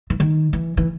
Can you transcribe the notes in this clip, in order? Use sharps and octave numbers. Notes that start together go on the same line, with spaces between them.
E3
D#3
E3
E3